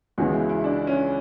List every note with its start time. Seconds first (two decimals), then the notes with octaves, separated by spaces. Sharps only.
0.18 C#2 C#3 E3 G#3 B3 F#4
0.33 E4
0.49 E4
0.64 D4
0.87 C#4